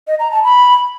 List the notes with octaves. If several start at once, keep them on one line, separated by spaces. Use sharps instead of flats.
D#5
A#5
A5
B5